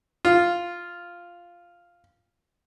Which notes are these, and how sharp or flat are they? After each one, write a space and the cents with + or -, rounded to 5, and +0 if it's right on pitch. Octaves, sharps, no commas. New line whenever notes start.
F4 +0